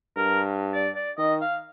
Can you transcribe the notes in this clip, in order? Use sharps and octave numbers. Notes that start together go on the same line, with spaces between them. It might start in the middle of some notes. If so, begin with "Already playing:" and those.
G2 A#4
D5
D5
D#3 D#5
F5